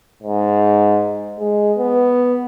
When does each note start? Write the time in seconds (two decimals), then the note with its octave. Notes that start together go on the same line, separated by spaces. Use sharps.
0.23 G#2
1.39 G#3
1.78 B3